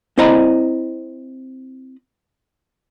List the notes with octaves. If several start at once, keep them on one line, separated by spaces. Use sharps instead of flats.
C4 E4 C5 D#5 A#5 B5